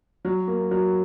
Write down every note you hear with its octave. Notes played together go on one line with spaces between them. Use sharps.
F#3
A#3
F#3